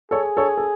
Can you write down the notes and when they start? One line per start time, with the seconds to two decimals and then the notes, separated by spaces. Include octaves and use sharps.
0.11 G#4 A4 C#5
0.37 A4 C#5
0.58 A4